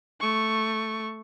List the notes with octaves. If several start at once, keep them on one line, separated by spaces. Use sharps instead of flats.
A3 C#6